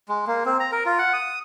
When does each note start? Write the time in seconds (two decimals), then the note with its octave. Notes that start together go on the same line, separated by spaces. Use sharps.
0.09 G#3
0.27 A#3
0.46 C4
0.60 A#5
0.72 A#4
0.86 F4
0.99 F#5
1.13 D#6